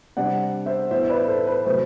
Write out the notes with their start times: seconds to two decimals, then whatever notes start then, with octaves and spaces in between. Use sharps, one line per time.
0.17 C3 G3 D4 D5 F#5
0.66 C5 E5
0.91 A2 E3 B3 C5 E5
1.09 B4 D5
1.28 A4 C5
1.47 B4
1.65 C3 F#3 A3 C4 B4